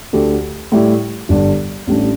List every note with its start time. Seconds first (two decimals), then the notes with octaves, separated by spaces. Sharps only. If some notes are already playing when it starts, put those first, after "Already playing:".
0.13 D2 D3 A3 G4
0.72 A2 G3 E4 G4
1.29 G1 G2 G3 D4
1.87 A1 A2 G3 D4